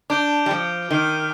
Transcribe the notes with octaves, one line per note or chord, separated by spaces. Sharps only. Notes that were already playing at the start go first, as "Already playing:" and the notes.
D4 D6 G6 D7 G7
G3
F3
D#3 D6 F6 C7 D#7 G7